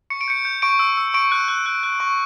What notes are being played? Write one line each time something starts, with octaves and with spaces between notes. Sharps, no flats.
C#6 C#7
D7
G6 C#7
G6
C#6 D7
E6
E6
C#6 D7
F#6
F#6
F#6
F#6
C#6